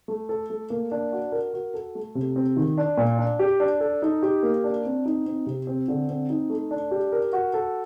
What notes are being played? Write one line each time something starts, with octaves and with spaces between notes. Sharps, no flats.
A3
A4
A3
A#3
D4
F#4
A#4
F#4
A4
A3
C3
C4
D#3
D4
A#2
D4
G4
D4
A4
D#4
G4
A#3
D4
C4
D#4
C4
C3
C4
D3
C4
D#4
A3
D4
G4
A#4
F#4
A4